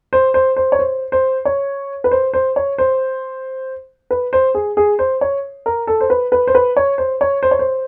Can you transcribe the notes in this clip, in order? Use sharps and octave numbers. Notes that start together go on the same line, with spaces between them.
C5
C5
C5
C#5
C5
C5
C#5
B4
C5
C5
C#5
C5
B4
C5
G#4
G#4
C5
C#5
A#4
A4
C5
B4
B4
C5
B4
C#5
C5
C#5
C5
C#5
C5